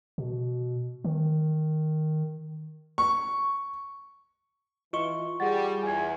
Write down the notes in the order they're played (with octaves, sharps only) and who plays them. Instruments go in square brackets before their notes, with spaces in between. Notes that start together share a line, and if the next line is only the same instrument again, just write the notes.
[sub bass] B2
D#3
[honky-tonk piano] C#6
[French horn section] E3 [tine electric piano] F4 C#6 [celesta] D#5 G7
[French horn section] G3 [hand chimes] G#4 A6 [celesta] F#5
[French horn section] E2 [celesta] G#5 G#6